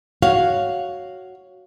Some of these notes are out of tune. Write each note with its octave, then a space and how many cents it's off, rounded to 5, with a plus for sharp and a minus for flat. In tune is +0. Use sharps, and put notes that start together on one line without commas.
F#4 +5 C#5 +0 F5 +0